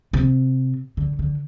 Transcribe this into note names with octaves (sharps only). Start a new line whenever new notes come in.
C3
D3
D3